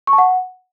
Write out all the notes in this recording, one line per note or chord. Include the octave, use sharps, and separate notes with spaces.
C#6
A5
F#5